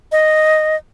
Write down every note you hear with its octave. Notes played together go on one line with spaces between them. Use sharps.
D#5